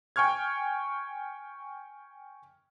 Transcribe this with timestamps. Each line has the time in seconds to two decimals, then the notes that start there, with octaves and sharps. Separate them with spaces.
0.16 G5 G#5 C#6 F6 G#6